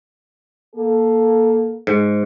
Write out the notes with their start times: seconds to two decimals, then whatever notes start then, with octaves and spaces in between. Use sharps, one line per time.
0.75 A#3 A4
1.87 G#2